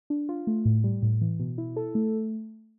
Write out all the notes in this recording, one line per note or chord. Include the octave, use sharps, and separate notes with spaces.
D4
F4
A3
A2
G3
A2
E3
B2
E4
A4
A3